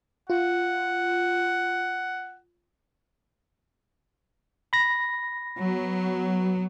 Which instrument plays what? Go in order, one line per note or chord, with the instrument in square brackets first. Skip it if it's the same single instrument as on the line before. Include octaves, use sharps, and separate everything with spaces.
[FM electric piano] F4 [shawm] F#5
[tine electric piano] B5 A#6
[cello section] F#3 B3